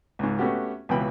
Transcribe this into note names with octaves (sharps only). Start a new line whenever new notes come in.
C#2 G#2
A3 B3 C#4 F#4 G4
C#2 B2 E3 G5 B5